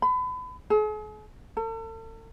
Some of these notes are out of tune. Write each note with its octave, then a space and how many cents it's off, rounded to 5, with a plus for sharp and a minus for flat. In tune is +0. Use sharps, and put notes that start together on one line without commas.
B5 +35
G#4 +45
A4 +40